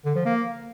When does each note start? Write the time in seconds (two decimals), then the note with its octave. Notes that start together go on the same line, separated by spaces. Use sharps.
0.05 D3
0.15 F3
0.25 A#3